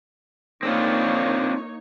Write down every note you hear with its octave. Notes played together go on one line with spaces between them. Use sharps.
A#3 C4 D4 D#4 F4 C#5